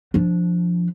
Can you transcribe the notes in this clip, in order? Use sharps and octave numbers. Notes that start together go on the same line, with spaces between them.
F3 D4